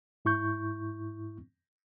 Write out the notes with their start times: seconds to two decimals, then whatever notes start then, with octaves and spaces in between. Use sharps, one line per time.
0.25 G#2 E4 C#6 G6